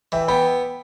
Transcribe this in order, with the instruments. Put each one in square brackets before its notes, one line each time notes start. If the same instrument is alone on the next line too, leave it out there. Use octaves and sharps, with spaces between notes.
[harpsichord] E3 [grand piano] E5 G5
[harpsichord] B3 [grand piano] G5 B5